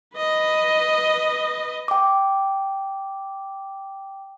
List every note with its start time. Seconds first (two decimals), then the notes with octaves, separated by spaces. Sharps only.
0.17 B4 D#5
1.88 G5 D6